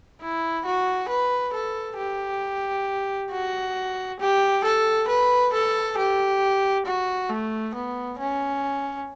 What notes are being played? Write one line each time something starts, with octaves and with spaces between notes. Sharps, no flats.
E4
F#4
B4
A4
G4
F#4
G4
A4
B4
A4
G4
F#4
A3
B3
C#4